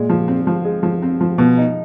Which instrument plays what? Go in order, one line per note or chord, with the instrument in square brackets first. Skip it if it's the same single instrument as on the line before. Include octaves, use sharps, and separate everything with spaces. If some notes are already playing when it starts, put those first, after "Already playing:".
Already playing: [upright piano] A#2 [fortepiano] G#3
[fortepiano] F3
C4
F3
G#3
F3
C4
F3
[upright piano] B2 [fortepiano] F3
[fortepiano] D#4